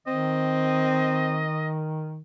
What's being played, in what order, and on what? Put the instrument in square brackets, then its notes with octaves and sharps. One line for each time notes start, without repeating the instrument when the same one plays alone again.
[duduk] D#3 [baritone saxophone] C4 [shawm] D#5